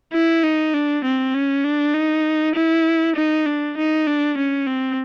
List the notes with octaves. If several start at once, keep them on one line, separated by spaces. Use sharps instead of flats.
E4
D#4
D4
C4
C#4
D4
D#4
E4
D#4
D4
D#4
D4
C#4
C4